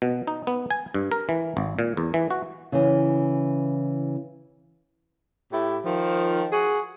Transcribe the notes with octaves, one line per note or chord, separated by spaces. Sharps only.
B2
D#4
B3
G#5
G2
A#4
E3
G#1
A#2
E2
E3
F#4
C#3 E3
A2 E4 G4
D#3 F3
F#4 G#4